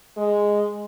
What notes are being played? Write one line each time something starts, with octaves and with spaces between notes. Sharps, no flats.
G#3